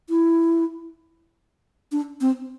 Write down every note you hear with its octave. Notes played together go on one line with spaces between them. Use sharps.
E4
D4
C4